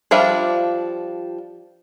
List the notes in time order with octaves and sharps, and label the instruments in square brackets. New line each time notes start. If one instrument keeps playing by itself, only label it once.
[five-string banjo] F3 G3 D4 F4 E5